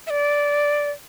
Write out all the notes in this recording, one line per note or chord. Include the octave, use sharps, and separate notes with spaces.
E5
D5